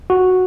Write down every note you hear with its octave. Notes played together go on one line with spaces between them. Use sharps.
F#4